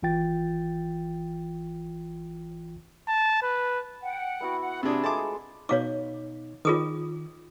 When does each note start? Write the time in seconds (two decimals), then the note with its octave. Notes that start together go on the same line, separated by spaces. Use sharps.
0.02 G#1 E3 F4 G5 A6
3.08 A5
3.42 B4
4.02 F#5 G5
4.41 B3 E4 F#4
4.59 F#5
4.83 C3 D4 G#4
5.04 G#3 A3 F4 A5 D6
5.69 B2 D#4 C#5 F5 D6
6.65 D#3 F4 G#4 D#6